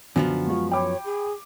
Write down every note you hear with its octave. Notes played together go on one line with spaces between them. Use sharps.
F#2 D3 F3 B3
G#3 F4 C#6
C#5 G5 B5 D6
G#4